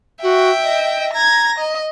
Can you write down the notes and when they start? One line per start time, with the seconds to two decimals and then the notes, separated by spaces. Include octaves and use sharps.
0.22 F#4 E5 G5
0.63 D#5
1.13 A#5 G#6 A#6
1.59 D#5